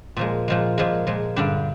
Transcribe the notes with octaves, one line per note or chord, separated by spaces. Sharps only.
A#2 F3 G#3
A#2 F3 G#3
A#2 F3 G#3
A#2 F3 G#3
G2 D3 G3 D4